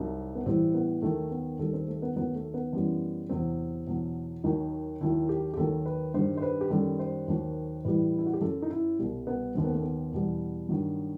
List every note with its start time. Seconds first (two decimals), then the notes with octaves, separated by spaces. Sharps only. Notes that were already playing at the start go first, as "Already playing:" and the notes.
Already playing: C2 C3 F#3 D#4
0.35 B3
0.46 A2 E3 G3 C4
0.74 B3
1.02 D#2 D#3 F#3 A3
1.31 B3
1.59 D#2 D#3 G3 A4
1.73 C4
1.88 A3
2.02 B3
2.16 D#2 D#3 F#3 B3
2.35 A3
2.54 B3
2.73 F#2 E3 G3
3.29 E2 C3 F#3 C4
3.87 E2 B2 F#3
4.44 D#2 D#3 F#3 D#4
5.01 D#2 D#3 F#3 E4
5.29 G4
5.54 G4
5.57 D#2 D#3 F#3 A4
5.86 B4
6.14 G2 D#3 G3 C5
6.37 C5
6.42 B4
6.61 G4
6.70 F#2 D#3 G3 A4
6.99 C5
7.28 D#2 D#3 F#3
7.85 A2 E3 G3 B4
8.18 E4
8.26 F#4
8.34 G4
8.41 F#2 F#3 A4
8.62 D#4
8.71 E4
8.99 C2 B2 G3
9.27 B3
9.55 D#2 D#3 F#3 C4
9.64 B3
9.73 A3
9.82 B3
10.12 E2 B2 G3
10.69 G2 D#3 F#3